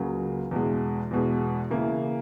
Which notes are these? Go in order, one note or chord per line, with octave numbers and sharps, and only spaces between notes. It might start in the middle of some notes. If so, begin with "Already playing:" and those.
Already playing: C#2 C#3 F#3 A#3
E2 B2 G#3
E2 B2 G#3
C#3 E3 A#3